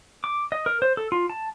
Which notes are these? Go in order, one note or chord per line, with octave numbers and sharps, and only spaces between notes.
D6
D#5
A#4
C5
A4
F4
A5